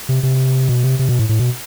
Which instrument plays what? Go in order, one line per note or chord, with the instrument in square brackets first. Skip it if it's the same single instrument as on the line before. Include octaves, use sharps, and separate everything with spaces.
[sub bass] C3
C3
B2
C3
C3
B2
A2
A2
B2